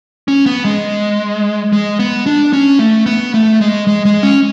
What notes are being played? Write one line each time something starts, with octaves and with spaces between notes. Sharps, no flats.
C#4
B3
G#3
G#3
B3
D4
C#4
A3
B3
A3
G#3
G#3
G#3
C#4